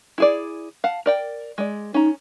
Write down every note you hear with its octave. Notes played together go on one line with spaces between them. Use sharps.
E4 G#4 D5
F5 F#5 A5
A#4 D5 G5
G#3 D5
C#4 D#4 A#5